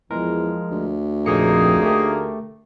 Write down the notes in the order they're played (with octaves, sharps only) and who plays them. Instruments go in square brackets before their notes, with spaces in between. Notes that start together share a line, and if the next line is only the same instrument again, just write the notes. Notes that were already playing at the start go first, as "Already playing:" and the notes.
[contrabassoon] E2 [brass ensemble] F3 [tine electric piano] G#3 A#4
[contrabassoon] D2
[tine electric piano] A#1 F2 C#7 [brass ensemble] F3 C4 [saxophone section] A#3 D#4 G#4
[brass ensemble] D3 A#4 [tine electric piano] A3 G4